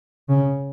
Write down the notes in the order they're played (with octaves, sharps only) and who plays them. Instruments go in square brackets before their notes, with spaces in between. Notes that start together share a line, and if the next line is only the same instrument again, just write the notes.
[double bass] C#3